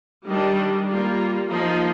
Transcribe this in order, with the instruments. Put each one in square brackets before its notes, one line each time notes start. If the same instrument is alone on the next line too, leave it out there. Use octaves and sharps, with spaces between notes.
[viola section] D#3 G3 D4
G3 A#3 F4
F3 A#3 D#4